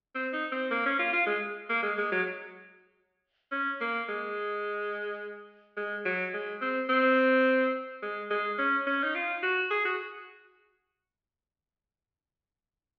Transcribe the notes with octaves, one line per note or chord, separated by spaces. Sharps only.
C4
D#4
C4
A#3
C#4
F4
F4
G#3
A#3
G#3
G#3
F#3
C#4
A#3
G#3
G#3
F#3
G#3
C4
C4
G#3
G#3
C#4
C#4
D#4
F4
F#4
G#4
F#4